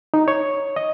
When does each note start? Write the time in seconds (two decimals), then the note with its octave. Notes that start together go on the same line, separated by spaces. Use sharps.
0.14 D#4
0.28 C#5
0.76 D#5